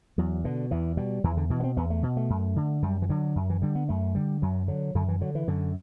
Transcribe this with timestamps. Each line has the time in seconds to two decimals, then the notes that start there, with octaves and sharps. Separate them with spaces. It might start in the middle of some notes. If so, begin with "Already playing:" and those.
0.18 E2 F#3
0.44 B2 D3
0.71 E2 E3
0.97 B2 G3
1.24 E2 E3
1.37 D3
1.50 B2 E3
1.60 B3
1.63 C4
1.77 E2 B3
1.90 A3
2.03 B2
2.17 A3
2.30 F#2
2.56 D3
2.83 F#2 G3
3.02 E3
3.09 D3 F#3
3.36 F#2
3.50 E3
3.62 D3 G3
3.75 B3
3.89 F#2 A3
4.15 D3 G3
4.42 F#2 F#3
4.68 D3 F#3
4.95 F#2 D3
5.08 E3
5.21 D3 F#3
5.35 E3
5.47 F#2 D3